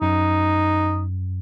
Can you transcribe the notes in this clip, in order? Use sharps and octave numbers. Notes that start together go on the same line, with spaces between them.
F#2 D#4